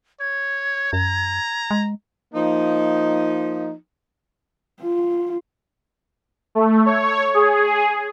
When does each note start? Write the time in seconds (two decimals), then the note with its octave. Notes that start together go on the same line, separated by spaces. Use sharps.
0.20 C#5 G#6
0.93 F#2 A#5
1.71 G#3
2.34 F3 A#3 D#4
4.82 F4
6.55 A3
6.86 C#5
7.34 G#4